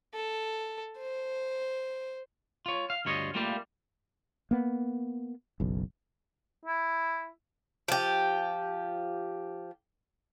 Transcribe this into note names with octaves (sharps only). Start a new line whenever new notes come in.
A4
C5
F4 C#5
F5
D2 G2 F4 C#5 D#5
G3 A3 A#3 F4
A#3 B3
F#1 B1
E4
F3 G4